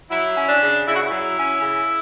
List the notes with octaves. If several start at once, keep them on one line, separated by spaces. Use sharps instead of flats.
F#3 E4
C#4
D4
C#3
C#3 E4
F#4
E4
F#3
C#4
C#3